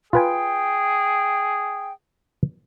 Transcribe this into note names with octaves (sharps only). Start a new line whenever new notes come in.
F4 G#4 B4 G5 G#5